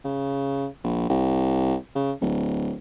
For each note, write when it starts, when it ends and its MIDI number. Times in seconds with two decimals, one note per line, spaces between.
0.04 0.67 49
0.84 1.06 34
1.09 1.75 36
1.95 2.12 49
2.21 2.73 26